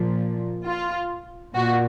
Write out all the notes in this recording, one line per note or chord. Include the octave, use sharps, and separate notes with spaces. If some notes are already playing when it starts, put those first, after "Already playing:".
Already playing: A#2 F3
F4
A#2 F#4